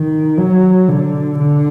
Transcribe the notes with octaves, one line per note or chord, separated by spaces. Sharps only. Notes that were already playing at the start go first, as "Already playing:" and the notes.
Already playing: D#3
F#3
D3
D3